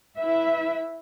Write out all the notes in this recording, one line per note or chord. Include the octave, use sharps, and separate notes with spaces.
E4 B4 E5